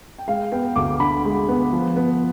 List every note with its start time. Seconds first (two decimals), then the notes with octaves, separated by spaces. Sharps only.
0.18 G5
0.28 G#3 F5
0.52 B3 G5
0.76 D2 D6
1.00 D3 B5
1.25 G#3
1.49 B3
1.73 F3
1.96 B3